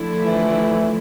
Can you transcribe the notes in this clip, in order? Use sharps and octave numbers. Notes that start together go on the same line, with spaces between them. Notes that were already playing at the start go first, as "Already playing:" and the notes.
Already playing: D3 F3 A3 E4
E3